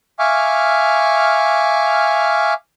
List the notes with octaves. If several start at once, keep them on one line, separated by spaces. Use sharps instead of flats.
E5 F5 G#5 C#6 D6 F6